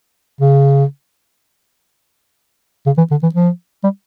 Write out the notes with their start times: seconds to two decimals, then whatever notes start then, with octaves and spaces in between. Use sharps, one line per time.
0.40 C#3
2.86 C#3
2.98 E3
3.11 D3
3.23 E3
3.34 F3
3.84 G3